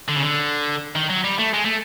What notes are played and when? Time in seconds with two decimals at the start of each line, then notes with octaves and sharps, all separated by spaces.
0.08 D3
0.16 C#3
0.23 D3
0.95 D#3
1.10 F#3
1.24 G3
1.39 A3
1.54 G#3
1.65 A3